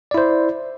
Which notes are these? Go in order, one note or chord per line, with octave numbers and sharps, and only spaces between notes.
E4 C5 D5